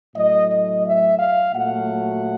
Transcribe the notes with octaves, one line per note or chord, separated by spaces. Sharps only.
A2 F#3 A3 D#5
D#5
E5
F5
A#2 F#3 A3 F#5